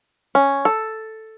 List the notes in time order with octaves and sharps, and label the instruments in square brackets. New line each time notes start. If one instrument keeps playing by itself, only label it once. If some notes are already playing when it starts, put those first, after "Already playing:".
[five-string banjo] C#4
A4